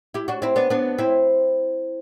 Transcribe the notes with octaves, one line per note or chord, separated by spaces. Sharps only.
E4 G4
D4 F#4
C4 E4
B3 D4
B3 D4
C4 E4